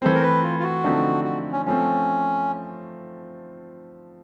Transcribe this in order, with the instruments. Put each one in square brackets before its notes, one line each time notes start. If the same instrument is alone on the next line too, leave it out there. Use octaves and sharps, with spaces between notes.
[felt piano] E3 A3 C4 [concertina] C5
[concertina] A#4
B4
F4
F4
F#4
[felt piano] D3 F3 A3 C4 D#4
[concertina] F#4
C#4
[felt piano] F3 A3 C4 [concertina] C#4